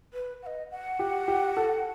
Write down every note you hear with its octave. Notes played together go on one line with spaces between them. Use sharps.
B4
F#5
D#5
F#5
G4
G4
A4